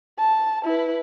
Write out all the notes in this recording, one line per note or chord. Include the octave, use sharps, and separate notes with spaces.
A5
E4 B4